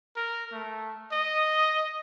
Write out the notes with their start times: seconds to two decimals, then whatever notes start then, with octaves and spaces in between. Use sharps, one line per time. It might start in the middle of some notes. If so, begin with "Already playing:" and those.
0.16 A#4
0.52 A3
1.12 D#5